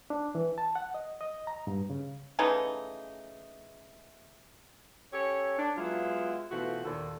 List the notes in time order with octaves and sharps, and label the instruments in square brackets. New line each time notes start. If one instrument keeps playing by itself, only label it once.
[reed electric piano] D4
E3
A5
F#5
D#5
D#5
A#5
G2
C#3
[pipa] C#3 E3 A3 D#4
[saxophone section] C#4 G4 A4 C#5
D4
F#3 G#3 B3 E4 F4
B2 E3 A3 C4 F4 F#4
D#2 A#2 A4